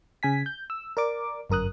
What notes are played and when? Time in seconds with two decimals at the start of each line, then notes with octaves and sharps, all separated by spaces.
0.23 C#3 G#5 B6
0.46 G6
0.70 E6
0.97 A#4 D5 D6
1.50 G1 F#2 A#4 D#6 F#6